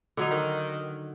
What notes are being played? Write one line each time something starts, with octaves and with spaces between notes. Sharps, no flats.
D3 F#3 D#4
D#3